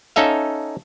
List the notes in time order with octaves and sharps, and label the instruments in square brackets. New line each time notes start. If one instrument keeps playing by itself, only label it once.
[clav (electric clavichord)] C#4 D#4 A4 E5 F5